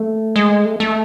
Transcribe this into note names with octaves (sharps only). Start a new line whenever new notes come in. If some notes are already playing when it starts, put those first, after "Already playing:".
Already playing: A3
G#3
A3
A3